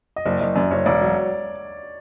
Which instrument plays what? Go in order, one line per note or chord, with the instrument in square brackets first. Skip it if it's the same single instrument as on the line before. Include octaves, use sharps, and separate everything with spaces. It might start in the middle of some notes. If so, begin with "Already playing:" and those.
[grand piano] D#5
[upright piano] F#1 [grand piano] D5
[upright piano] F#1 [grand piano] D#5
[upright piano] F#2 [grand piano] D5
[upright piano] F#1 [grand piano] C#5
[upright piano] E1 [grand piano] D5
[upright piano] F#3